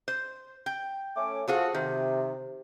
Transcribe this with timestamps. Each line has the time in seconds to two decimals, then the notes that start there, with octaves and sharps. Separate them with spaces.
0.08 C5
0.66 G5
1.17 A3 C#4 D6
1.48 F3 F#4 G#4 A4
1.74 C3 D#3